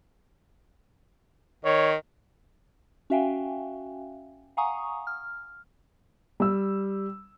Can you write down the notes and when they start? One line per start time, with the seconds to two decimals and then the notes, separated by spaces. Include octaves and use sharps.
1.65 D#3 C#5
3.10 C#4 F#4 E5 F5 G5 G#5
4.57 F5 F#5 G#5 A#5 C#6 D#6
5.07 F6
6.40 G3 E6